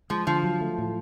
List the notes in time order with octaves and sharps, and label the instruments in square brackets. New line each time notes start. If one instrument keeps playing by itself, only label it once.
[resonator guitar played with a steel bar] F3 [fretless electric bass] G#3
[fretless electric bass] D3 [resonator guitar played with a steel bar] F3
[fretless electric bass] F#3
A3
A2